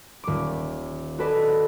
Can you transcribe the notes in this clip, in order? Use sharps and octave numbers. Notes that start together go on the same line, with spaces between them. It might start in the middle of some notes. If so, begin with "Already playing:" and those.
D#1 D6
F#4 G#4 A4 B4 D5 D#5